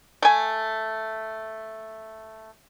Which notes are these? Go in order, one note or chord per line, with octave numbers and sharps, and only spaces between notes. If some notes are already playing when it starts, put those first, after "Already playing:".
A3 G#5